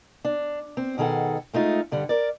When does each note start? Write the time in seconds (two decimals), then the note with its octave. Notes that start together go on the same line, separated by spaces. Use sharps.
0.25 D4
0.77 C4
0.98 B2 D#3 G#4 A4 F#5
1.53 G#3 A3 D#4 F4
1.91 G2 D3 G3
2.09 A#4 D5